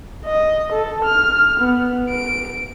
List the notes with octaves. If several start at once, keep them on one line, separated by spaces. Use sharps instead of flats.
D#5
A4
F6
B3
D7